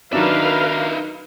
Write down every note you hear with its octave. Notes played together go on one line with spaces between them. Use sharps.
D#3 F#3 D4 D#4 A#4 B4 E5 F5